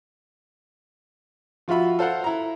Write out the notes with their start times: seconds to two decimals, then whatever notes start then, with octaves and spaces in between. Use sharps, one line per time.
1.68 F3 F4 F#4 E5 B5
1.99 A4 C5 F5 F#5
2.24 E4 A#5